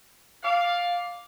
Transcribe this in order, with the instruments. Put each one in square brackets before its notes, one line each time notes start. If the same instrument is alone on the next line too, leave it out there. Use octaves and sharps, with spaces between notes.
[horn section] D5 F5